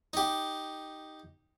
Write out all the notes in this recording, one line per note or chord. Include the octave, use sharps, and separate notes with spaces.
D#4 G4